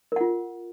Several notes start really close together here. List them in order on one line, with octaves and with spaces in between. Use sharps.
A#4 F#5 F4